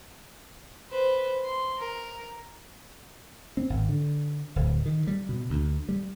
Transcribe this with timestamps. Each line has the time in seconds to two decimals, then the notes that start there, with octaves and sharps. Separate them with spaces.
0.90 B4 C5
1.45 C6
1.79 A#4
3.57 C4
3.70 G#1
3.89 D3
4.56 D1
4.86 D#3
5.07 G3
5.29 B2
5.50 D2
5.89 G3